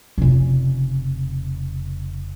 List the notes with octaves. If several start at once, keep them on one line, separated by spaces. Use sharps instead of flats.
F1 C#3